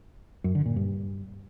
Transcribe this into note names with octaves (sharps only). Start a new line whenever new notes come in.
F#2
D3
A#2
G2